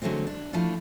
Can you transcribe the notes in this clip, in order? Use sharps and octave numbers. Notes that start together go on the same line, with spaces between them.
D3 F#3 G#3 A3 C4
D4
F3 A3 D4 E4 F4